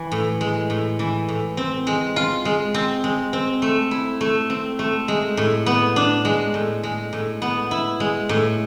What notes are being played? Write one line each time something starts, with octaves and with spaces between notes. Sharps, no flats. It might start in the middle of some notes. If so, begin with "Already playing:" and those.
Already playing: E3
A2
G#3
A2
E3
A2
C4
G#3
F4
G#3
C4
G#3
C4
A3
E4
A3
C4
A3
G#3
A2
B3
D4
G#3
A2
G#3
A2
B3
E4
G#3
A2